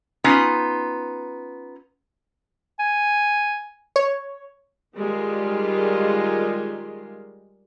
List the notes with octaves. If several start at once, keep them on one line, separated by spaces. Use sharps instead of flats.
B3 C#4 D#4 F4
G#5
C#5
D#3 G3 G#3 F4